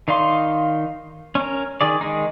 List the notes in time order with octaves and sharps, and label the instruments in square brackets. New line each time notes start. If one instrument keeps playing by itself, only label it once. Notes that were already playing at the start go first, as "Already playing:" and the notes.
[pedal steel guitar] D#3 D#4 D5 F5 C6
C#4 A#4
D#3 G#4 D5
D#3 G#3 D#4